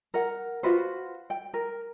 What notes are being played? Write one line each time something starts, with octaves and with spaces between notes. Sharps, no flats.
A#4 F#5
F4 F#4 B4 C5
G5
A#4